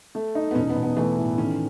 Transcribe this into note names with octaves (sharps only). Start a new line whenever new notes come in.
A3
D#4
B3
E1 C#4
B3
E1
B3
E3 A3
A2
D#3 C#4